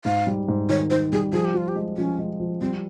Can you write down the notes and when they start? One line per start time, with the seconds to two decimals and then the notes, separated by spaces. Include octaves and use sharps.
0.05 G#2 F5
0.27 G3
0.49 G#2
0.69 D#3 C#5
0.90 D#3 C5
1.12 G3 G#4
1.33 F3 G#4
1.45 G4
1.54 F3 F4
1.68 G4
1.76 G#3
1.97 F3 C#4
2.19 G#3
2.40 F3
2.61 G3 C4